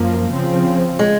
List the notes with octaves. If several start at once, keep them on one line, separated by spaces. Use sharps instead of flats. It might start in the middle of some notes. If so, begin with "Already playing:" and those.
Already playing: F#2 F3 A#3
C#3 F3 C4
G#3